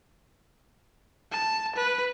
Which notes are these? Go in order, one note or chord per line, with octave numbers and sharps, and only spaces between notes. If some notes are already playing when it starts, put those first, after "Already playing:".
A5
B4